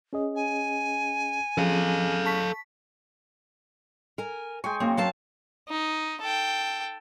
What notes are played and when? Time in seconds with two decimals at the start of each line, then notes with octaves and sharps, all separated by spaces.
0.13 C#4 G#4 D#5
0.36 G#5
1.58 F3 C#4 G#4 A4 F5
2.26 A5 C#6 B6
4.18 A#4 G#5
4.64 G#3 G5 G#5 C#6
4.80 F#2 A#3 C4
4.97 F#3 F5 A5
5.69 D#4
6.22 A4 G5